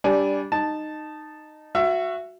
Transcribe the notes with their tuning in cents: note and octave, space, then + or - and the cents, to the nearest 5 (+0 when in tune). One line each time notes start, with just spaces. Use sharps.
G3 +0 D4 -10 G#5 +10
D#4 -15 A5 +0
F#4 -10 E5 +25